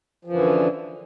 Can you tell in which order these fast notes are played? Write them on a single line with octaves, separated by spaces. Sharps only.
F3 F#2 E3 D3